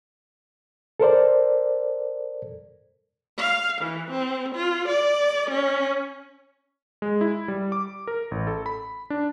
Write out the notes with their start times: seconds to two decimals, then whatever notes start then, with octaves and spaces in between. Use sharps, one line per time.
1.00 A4 A#4 C5 D5
3.38 F5
3.81 E3
4.11 C4
4.55 F4
4.88 D5
5.50 C#4
7.02 G#3
7.21 E4
7.48 G3
7.72 D6
8.07 A#4
8.31 A1
8.47 A4
8.66 B5
9.10 D4